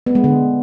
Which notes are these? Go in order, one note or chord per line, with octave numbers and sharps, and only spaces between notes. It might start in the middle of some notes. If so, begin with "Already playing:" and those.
B3
G#3
D3